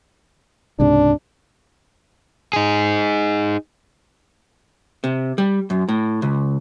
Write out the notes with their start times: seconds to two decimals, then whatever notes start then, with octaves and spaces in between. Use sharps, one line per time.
0.80 C#2 G#2 C3 D4
2.53 D#4 G#4
5.04 C3
5.38 G3
5.70 F#2
5.89 A2
6.22 C#2